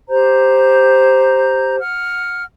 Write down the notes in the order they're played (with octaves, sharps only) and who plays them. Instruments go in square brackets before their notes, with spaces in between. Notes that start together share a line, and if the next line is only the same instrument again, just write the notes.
[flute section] G4 C5 A#5 G6
F#5 F6